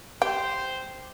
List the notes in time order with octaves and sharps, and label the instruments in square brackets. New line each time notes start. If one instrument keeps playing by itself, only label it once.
[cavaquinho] G4 [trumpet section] C5 [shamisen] G5